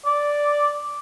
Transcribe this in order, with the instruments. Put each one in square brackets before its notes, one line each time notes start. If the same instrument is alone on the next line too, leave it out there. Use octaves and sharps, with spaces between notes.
[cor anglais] D5